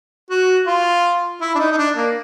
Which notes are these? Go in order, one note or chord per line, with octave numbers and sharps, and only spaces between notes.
F#4
F4
E4
D4
D#4
D#4
D4
A#3